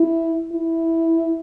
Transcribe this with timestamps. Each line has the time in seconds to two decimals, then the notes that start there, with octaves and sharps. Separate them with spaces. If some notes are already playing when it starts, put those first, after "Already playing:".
Already playing: E4
0.52 E4